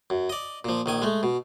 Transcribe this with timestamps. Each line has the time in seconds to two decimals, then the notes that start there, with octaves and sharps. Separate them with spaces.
0.10 F#2
0.30 D5 D#5
0.65 A#2 F3
0.86 A#1 D#3 G#5
1.02 G#3 A3
1.23 B2